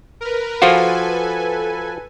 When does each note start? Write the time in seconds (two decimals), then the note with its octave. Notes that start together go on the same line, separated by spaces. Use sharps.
0.21 A#4 B4
0.62 F3 F4 F#4 A4 B4 G#5